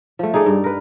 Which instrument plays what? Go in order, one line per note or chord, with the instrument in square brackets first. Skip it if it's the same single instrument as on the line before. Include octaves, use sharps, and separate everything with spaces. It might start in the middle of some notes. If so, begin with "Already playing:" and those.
[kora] F3 A3
D#4 G#4 A4 D5
G2
A#4 B4